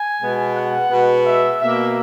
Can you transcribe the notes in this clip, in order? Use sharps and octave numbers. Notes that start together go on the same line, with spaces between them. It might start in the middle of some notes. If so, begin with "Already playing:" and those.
Already playing: G#5
B2 G#3 B3
F#5
B2 G#3 B3
E5
B2 A#3 E5